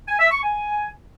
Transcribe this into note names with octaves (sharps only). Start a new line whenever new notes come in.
G#5
E5
C#6
G#5